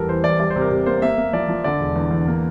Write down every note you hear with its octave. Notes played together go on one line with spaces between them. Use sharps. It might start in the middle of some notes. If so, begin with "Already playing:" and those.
Already playing: E2 G3 A4 A#4
E3 C5
E2 D5
G3 D5
C5
C3
A#4
C3
A#3 C5
A#3 E5
A#3
F3 D5
F3
D3 D5
E1
E2
E2
A#3